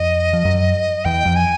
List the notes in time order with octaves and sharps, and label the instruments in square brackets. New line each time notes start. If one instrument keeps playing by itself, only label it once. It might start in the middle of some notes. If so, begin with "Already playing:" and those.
Already playing: [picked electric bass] F2 F3 [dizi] D#5
[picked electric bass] F3
F#2 F#3
[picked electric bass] E2 E3 [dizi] G5
[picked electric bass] F2 F3
[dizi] G#5